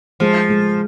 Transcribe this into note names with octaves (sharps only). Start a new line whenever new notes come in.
F3 G#3
G#3